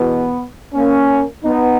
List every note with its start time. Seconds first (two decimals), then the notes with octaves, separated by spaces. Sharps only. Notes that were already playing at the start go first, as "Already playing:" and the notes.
Already playing: E2 B2 B3
0.75 A#3 C#4
1.44 B3 D#4